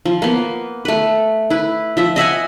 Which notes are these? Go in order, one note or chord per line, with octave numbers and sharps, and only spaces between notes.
F3
A#3 B3
A3 B4
E4 B4
F3 E5
D#5 E5 F#5 G#5